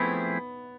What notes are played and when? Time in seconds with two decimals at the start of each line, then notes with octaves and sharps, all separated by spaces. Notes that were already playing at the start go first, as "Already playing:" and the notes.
Already playing: F3 A3 B3 C4 E4 G#4